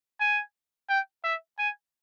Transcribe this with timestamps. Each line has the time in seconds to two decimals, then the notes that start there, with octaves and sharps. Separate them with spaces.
0.20 G#5
0.89 G5
1.24 E5
1.59 G#5